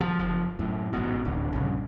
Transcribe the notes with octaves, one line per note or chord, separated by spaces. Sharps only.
F3
F#1 F3
F#2 A2
A1 G#2 B2
D1 A#1 D3
A#1 G2 C#3